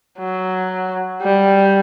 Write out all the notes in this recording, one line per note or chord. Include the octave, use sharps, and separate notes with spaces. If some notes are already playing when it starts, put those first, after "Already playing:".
F#3
G3